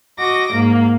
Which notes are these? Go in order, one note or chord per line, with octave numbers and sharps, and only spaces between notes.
F#4 D#5 D6 A#6
G#2 A#3